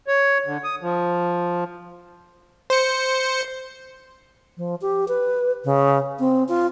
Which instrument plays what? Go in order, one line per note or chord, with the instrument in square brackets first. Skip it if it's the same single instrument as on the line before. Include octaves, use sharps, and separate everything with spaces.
[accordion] C#5
D3
D#6
F3
[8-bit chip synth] C5 C#7
[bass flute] F3
G4
B4
C#3
C4
F4